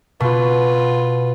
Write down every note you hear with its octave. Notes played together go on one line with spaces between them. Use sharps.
B2 F4 B4